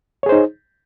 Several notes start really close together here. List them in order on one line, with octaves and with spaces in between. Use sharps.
C#5 G#4 C5 D#4